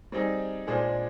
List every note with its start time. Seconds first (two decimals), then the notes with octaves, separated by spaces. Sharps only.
0.12 G3 C4 D#4 G#4
0.67 A#2 G#3 D4 G#4 C5